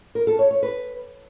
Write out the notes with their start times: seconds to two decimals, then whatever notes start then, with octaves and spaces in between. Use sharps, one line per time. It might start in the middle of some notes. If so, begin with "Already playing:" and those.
0.15 A#4
0.27 A4
0.39 C#5
0.51 C#5
0.63 B4